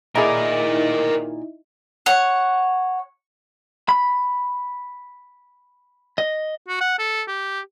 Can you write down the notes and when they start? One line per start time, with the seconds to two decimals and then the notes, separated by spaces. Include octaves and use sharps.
0.15 A#2 D#3 D#4 E4 G#4 A#4 D5
2.06 C#5 F#5
3.89 B5
6.18 D#5
6.68 F#4
6.81 F#5
6.99 A4
7.27 G4